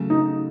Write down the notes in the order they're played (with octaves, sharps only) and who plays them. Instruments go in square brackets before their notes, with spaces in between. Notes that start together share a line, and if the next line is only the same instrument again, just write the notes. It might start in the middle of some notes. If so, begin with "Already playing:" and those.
Already playing: [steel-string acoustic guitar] C#3 F#3 A3
[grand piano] D#4